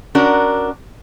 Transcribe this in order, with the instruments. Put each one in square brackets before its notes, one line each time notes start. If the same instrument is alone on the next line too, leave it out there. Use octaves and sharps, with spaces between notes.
[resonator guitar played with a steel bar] C#4 D4 F#4 A#4